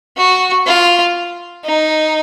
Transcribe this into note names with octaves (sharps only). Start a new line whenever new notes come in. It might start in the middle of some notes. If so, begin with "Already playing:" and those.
F#4
F4
D#4